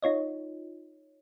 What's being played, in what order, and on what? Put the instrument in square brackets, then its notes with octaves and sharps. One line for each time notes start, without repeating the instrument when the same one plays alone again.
[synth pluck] D#4 F4 C#5 D#5